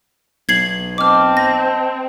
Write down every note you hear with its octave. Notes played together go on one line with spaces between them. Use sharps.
B1 G#6 C7 F#7
C4 D#5 A5 D6 F6
A#6